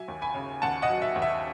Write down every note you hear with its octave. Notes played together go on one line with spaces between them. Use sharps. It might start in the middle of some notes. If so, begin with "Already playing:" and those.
Already playing: F#3 E5 G#5
D#2
G#5 B5
C#3
D#2 F#5 A5
D#5 F#5
F#3
E5
D#2
E5